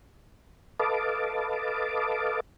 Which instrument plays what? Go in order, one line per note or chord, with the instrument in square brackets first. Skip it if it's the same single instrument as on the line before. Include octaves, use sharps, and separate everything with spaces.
[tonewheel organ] A4 B4 D#5 F5 A5 D6